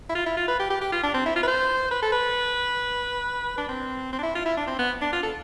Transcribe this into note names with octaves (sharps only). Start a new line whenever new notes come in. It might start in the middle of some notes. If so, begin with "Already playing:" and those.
E4
F4
E4
F4
B4
G4
G4
G4
F4
D4
C4
E4
F4
B4
C5
B4
A4
B4
D4
C4
C4
D4
E4
F4
E4
D4
C4
B3
D4
F4
A4